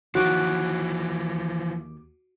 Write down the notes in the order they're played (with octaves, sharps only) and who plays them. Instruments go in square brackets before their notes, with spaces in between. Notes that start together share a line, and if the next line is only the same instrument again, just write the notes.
[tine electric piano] D#2 D6 [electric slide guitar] E3 F3 [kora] F#4